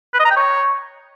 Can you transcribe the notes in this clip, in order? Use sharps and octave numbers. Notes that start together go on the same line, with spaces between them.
B4
D#5
A#5
G5
C#5